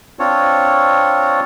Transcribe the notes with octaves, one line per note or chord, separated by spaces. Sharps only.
C4 D4 F4 C#5